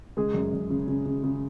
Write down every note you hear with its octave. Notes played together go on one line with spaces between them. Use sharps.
C#3 G#3 G#4
F#2
F#2
C#3
C#3
C#3
C#3